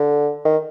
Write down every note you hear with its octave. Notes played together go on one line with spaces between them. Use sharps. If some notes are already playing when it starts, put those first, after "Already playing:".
Already playing: D3
D#3